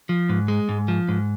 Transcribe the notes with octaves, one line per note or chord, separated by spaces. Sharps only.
F3
G#2
G#3
G#2
F3
G#2